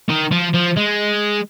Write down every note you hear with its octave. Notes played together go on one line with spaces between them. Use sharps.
D#3
F3
F3
G#3